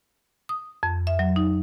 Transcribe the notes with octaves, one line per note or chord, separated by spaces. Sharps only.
D#6
F2
E5
F#3
D#4